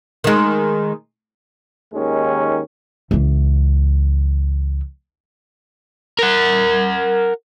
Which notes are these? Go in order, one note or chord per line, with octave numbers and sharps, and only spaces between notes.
D#3 G#3
D#2 D#3 G#3 C#4
C#2 E3
A#4 F#5